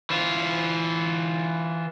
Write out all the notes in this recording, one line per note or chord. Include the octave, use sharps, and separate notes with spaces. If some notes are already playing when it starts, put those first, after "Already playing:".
E3 F4